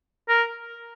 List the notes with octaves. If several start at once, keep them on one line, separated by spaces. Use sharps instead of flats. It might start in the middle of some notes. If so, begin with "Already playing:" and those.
A#4